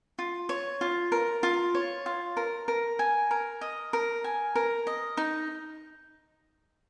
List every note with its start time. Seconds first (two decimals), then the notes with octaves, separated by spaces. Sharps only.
0.19 F4
0.49 C#5
0.81 F4
1.12 A#4
1.43 F4
1.75 C#5
2.06 F4
2.37 A#4
2.68 A#4
2.99 G#5
3.31 A#4
3.61 D#5
3.93 A#4
4.24 G#5
4.56 A#4
4.87 D#5
5.17 D#4